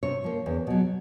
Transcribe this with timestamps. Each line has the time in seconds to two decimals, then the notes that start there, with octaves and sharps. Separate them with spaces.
0.03 C3 C#5
0.24 F3 A#3
0.46 E2
0.67 B2 F#3